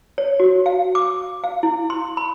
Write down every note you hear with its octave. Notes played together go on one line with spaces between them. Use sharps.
C#5
F#4
F5
D6
F5
E4
C6
B5